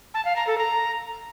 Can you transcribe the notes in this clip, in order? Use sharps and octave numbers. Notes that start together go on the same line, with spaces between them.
A5
F5
A#5
A4
A#5